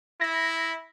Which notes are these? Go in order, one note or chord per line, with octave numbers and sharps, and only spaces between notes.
E4 A#6